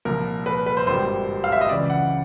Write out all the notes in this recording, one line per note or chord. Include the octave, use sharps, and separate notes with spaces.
C2 A#2 F3 A#4
B4
B4
C5
G#1 G2 D#3 G3 C5
F5
E5
D#5
C#2 C#3 E3 D5
F#5